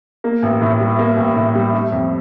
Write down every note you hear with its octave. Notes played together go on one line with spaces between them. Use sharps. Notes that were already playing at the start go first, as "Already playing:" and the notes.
A#3
A1
A2
G3
A#3
A1
A2
G3
A3
F2